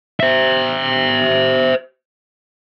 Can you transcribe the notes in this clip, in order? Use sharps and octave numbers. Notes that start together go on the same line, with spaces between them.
C5 E5